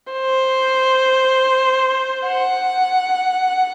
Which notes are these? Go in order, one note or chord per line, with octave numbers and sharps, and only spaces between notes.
C5
F#5